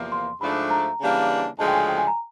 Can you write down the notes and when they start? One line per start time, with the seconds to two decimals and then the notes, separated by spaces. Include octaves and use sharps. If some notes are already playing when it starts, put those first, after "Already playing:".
Already playing: E2 C3 F3 A#3
0.12 C6
0.41 G#2 F3 A3 D4 B5
0.71 A#5
1.00 C#3 E3 G3 A#3 D4
1.58 D2 C#3 F3 G#3 A5
1.67 G5
1.74 G#5
1.88 G5
1.98 G#5
2.07 A#5